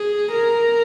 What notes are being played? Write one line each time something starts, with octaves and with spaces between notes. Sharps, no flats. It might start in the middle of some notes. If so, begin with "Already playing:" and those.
Already playing: G#4
A#4